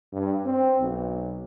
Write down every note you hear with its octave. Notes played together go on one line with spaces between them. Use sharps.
G2
C4
B1